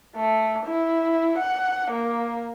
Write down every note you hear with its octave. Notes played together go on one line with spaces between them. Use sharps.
A3
E4
F#5
A#3